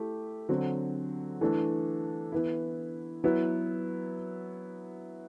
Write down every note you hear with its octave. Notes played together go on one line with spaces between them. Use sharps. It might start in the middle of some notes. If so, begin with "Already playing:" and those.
Already playing: A3 E4 G4
D3 F#3 C4
E3 A3 D4 A4
E3 B3 E4
F#3 B3 E4 B4